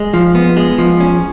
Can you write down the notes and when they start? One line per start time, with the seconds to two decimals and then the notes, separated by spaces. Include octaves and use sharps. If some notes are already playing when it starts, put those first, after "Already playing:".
Already playing: G#3
0.14 F3
0.35 B3
0.57 G#3
0.78 F3
1.00 C#4